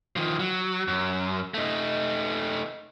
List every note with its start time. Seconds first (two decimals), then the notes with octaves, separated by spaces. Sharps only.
0.16 D#3 F3
0.40 F#3
0.88 F#2
1.54 A3 D#4